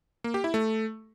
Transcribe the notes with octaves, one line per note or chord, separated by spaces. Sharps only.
A#3
G4
E4
A3